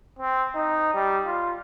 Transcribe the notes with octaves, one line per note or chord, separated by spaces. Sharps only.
C4
D#4
G3
F4